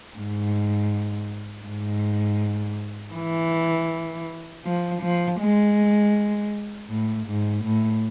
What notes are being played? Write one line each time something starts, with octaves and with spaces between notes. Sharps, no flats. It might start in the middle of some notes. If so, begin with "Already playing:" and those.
G#2
G#2
E3
F3
F3
G#3
A2
G#2
A2